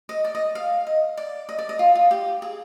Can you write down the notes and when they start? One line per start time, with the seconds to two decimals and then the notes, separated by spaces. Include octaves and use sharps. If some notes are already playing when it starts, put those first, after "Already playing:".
0.09 D#5
0.24 D5
0.35 D#5
0.55 F5
0.87 D#5
1.17 D5
1.49 D#5
1.58 D5
1.69 D#5
1.79 F4
1.95 F4
2.11 G4
2.42 G#4